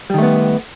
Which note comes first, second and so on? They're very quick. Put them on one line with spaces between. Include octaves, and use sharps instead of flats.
G3 D#3 A3 B3